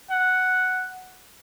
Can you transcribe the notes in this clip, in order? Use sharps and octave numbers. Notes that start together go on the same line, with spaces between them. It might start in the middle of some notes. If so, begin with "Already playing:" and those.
F#5